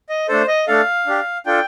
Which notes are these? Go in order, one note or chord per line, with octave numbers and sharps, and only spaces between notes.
D#5
A3 D4 A4 C5
D#5
A3 D4 A4 F5
D4 G4
D4 F4 A4 G5